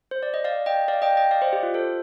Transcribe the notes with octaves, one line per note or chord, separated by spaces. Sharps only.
C5
D5
D#5
D5 F5
D#5 G5
D5 F5
D#5 G5
D#5 G5
D5 F5
C5 D#5
G4
F4
A4 C5